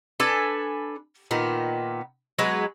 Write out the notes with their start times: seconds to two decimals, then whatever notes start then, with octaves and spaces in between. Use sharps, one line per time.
0.20 D4 A4 B4 G#5
1.31 A#2 D#3 B3
2.39 F#3 G#3 B3 B4